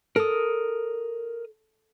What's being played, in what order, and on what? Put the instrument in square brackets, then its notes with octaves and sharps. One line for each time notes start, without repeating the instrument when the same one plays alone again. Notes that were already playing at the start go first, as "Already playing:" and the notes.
[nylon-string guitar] A4 [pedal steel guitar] A#4 D#6